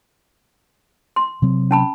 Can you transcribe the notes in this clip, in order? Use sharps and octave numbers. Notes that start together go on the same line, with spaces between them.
C6
C3 F#3 C4
C#4 A5 B5